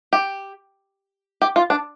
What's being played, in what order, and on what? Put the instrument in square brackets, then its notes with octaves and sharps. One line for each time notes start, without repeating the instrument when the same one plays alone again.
[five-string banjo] G4
G4
F4
D4